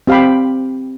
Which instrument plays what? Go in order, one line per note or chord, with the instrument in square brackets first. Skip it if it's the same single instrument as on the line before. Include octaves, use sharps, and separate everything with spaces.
[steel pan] C4 G4 F5 G5 B5